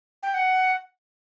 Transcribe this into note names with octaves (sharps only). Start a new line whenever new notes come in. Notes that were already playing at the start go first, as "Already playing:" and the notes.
G5
F#5